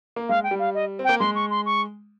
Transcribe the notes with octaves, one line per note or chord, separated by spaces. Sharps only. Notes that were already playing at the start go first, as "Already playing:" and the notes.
A#3
G#3 F5
G5
G3
F5
D#5
C4
A#3 G5
G#3 C6
C#6
C6
C#6